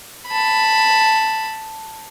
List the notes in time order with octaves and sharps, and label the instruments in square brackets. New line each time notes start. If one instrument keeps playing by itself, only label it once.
[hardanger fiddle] A5 B5